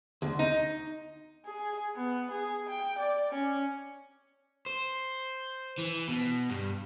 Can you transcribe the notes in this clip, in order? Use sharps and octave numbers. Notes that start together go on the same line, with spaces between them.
D2
D#4
G#4
B3
G#4
G5
D5
C#4
C5
E3
B2
G2